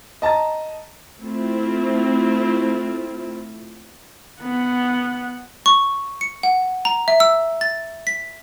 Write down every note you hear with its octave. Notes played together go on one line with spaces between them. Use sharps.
D#5 A5 A#5 A6
A3 C4 E4 F4
B3 F#5
C#6
C#7
F#5
A#5
E5
E6
A6
B6